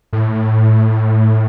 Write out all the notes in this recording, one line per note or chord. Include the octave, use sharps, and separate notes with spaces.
A2